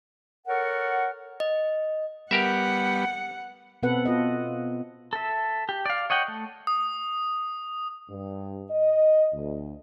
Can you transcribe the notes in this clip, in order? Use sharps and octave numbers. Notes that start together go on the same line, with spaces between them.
A4 A#4 C#5 F#5
D#5
G3 B3 G4 A#4 E5 F#5
B2 B3 C4 A4 B4 F#5
F4 A4 D#5
A4 E5
G4
D5 F5
C#5 D#5 F#5 G5
A3
D#6
G2
D#5
D2